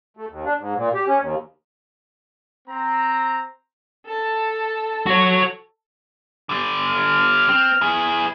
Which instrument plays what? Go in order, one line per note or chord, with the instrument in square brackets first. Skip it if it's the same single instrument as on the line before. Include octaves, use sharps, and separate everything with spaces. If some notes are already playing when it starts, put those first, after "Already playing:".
[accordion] A3
D#2
D4
G#2
A#2
G4
C#4
D#2
[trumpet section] C4 A#5
[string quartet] A4 A5
[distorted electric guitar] F#4 C#5
[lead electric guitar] D3 G3
[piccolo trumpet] F6
[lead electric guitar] C4
E4 G#4